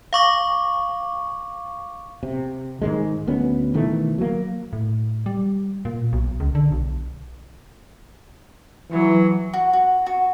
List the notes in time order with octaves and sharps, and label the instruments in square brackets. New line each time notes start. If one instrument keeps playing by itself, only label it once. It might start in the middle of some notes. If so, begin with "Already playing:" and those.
[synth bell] F5 C#6 D6
[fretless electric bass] C3
G#2 D#3 G#3
D2 B3 C#4
B2 D#3 E3 A3
F#3 A#3
[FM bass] A2
G3
A#2
B1
C#2
D3
B1
[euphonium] E3 [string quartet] F#3
[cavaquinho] F#4
F#4
F#4